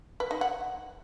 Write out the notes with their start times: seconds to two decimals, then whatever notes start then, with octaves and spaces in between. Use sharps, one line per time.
0.20 B4
0.31 D#4
0.41 F#5